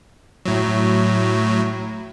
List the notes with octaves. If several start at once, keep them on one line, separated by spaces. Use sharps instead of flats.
A2 F#3